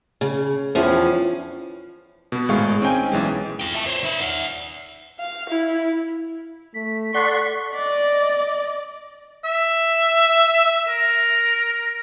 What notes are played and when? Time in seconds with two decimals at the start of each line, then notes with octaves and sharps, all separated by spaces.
0.21 C#3
0.75 E2 G2 F3 C#4
2.32 B2 B3
2.49 G#1 A2 G#3 F5 C#6
2.82 C4 C#4 D#4 G5 G#5
3.12 B1 E3 G#3
3.60 F4 G5
3.74 E5 A5
3.86 C5 C#5
4.03 D#4 E5
4.21 E5 F#5
5.19 F5
5.49 E4
6.74 A3 B6
7.14 A4 D5 F#5 C6 C#6
7.75 D5 D#5
9.44 E5
10.88 A#4